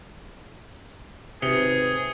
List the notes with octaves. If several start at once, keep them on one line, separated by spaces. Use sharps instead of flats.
G#1 C3 G#4 B4 D#6 C#7 G7